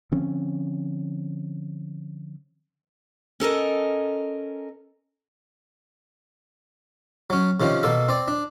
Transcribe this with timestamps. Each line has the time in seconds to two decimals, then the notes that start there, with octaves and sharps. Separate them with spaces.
0.12 D3 F3 C4 C#4
3.40 C#4 A4 A#4 D#5
7.30 F#3 C#4
7.60 C3 D#3 F3 C#4
7.83 B2 A#3 A4
8.09 C4 D5
8.28 D4